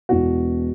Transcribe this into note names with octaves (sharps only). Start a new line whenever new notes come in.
E1 E2 B2 F#4